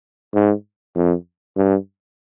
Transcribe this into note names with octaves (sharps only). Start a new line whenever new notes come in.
G#2
F2
G2